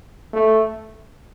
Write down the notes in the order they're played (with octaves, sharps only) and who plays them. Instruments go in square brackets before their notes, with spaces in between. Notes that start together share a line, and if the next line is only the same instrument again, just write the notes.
[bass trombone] A3